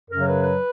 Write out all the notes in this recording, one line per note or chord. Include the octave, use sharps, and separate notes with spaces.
F#2 C#3 F#3 A#4
B4
B4